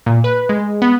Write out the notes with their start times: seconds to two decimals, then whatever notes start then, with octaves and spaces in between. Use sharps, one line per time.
0.06 A#2
0.24 B4
0.49 G#3
0.82 B3